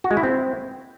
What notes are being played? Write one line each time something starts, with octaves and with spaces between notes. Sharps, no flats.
F#4
G#3
E4
C4